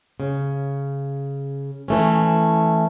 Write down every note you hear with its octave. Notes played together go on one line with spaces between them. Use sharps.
C#3
E3 A3 C#4